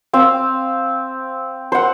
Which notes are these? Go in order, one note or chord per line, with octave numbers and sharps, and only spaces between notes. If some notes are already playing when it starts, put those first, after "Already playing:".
C4 F5
C5 F#5